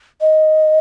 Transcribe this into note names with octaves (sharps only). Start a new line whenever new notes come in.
D#5